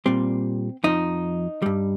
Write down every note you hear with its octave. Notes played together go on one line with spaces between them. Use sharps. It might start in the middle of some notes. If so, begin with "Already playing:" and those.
A#2 G3 C4
F2 F3 D#4
G2 G3